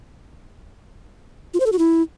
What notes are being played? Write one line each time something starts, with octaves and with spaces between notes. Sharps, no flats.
F4
C5
A4
F#4
E4